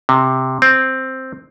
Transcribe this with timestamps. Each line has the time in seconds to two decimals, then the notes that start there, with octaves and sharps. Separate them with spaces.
0.09 C3
0.62 C4